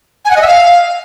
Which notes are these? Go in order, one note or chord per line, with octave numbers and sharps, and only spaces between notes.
G#5
F#5
D#5
E5
F5